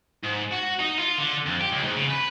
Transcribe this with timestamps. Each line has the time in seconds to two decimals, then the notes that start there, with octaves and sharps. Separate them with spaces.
0.23 G#2
0.51 F#4
0.79 D#4
0.99 F4
1.18 D3
1.45 F2
1.60 G4
1.72 C#2
1.84 G#2
1.96 C#3
2.10 B4